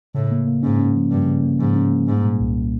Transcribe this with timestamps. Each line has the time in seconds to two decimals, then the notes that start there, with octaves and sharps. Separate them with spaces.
0.15 A2 C#3
0.32 A#3
0.47 A#3
0.63 G#2 C#4
0.79 C#4
0.95 F3
1.11 G2 C#3
1.27 C#3
1.43 A#3
1.60 G#2 F3
1.76 C#4
1.91 A#3
2.08 G#2 G3
2.23 A#2
2.40 C2